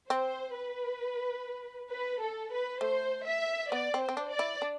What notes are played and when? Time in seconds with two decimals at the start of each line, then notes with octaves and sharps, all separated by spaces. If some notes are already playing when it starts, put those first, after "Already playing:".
0.10 C4 C5
0.55 B4
1.91 B4
2.21 A4
2.52 B4
2.81 A3 C5
3.27 E5
3.71 B3 D5
3.94 C4
4.01 C5
4.09 C4
4.17 D4
4.32 D5
4.39 E4
4.62 D4